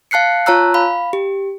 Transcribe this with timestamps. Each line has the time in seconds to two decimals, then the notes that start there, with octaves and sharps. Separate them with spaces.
0.11 F5 A5 F#6 C7 C#7
0.46 F4 C#5 A5 A#5 E6 F#6
0.74 F5 B5
1.13 G4